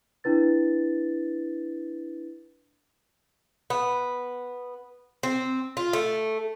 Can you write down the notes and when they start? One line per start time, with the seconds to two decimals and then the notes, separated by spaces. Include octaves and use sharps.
0.24 D4 E4 B4 A6
3.70 B3
5.23 C4
5.77 F4
5.93 A3